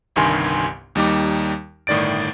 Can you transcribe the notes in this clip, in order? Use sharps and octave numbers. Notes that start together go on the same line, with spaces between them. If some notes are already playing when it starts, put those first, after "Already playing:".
G1 C2 G2 D#3 G#5 C6
D#2 G3 D#4 D6
G1 A2 D#3 D5 A6 D7